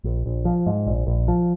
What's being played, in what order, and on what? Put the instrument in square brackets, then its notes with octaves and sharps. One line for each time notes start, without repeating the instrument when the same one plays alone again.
[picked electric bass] A#1
A#1
F3
G#2
A#1
A#1
F3